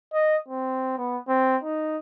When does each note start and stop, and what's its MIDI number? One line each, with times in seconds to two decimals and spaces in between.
0.13 0.37 75
0.48 0.94 60
0.98 1.18 59
1.28 1.56 60
1.63 1.98 63